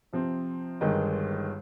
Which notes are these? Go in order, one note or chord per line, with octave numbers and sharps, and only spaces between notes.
C3 F3 C4
G1 G2 D#3 G#3 D#4